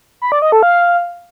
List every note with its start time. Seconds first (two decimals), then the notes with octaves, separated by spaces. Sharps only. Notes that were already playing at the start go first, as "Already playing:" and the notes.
0.22 B5
0.32 D5
0.42 D#5
0.52 A4
0.63 F5